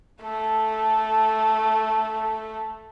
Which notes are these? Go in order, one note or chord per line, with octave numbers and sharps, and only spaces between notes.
A3 A4